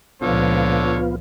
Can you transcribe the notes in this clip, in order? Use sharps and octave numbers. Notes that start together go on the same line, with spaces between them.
C#2 A#2 D3 F3 B3 F4 C#5